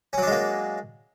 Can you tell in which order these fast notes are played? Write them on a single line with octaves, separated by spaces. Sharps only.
C#4 F#3 D4 G#3 A#3